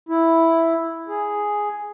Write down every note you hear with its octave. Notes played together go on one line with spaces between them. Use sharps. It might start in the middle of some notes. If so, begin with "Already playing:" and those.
E4
G#4